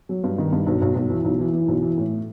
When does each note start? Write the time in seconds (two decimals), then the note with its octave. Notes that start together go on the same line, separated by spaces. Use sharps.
0.09 F#3
0.24 G2
0.38 D#3
0.52 G2
0.66 B1
0.82 B1
0.95 B1
1.10 E3
1.24 B1
1.40 E3
1.53 E3
1.68 B1
1.82 E3
1.98 A2